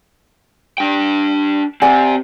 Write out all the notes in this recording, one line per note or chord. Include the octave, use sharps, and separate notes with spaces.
D4 G5
C4 G4 D5 F#5 G#5